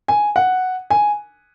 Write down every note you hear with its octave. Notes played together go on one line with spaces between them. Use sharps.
G#5
F#5
G#5